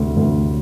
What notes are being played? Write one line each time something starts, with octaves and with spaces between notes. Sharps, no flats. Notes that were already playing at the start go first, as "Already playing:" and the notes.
Already playing: D2 C3
D2